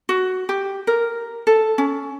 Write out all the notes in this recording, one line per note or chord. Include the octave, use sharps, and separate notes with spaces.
F#4
G4
A#4
A4
C#4